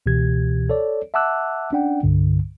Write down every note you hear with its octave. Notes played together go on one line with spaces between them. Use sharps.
C#2 B2 E3 G4 G#6
A4 C#5 D5
E5 F#5 A5 D6 E6 F#6
C#4 D4 D5 F#5 G5
C2 G2 D3